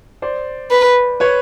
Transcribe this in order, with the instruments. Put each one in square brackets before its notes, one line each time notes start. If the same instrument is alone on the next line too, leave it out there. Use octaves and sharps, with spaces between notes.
[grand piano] C5 D5
[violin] B4
[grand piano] B4 C#5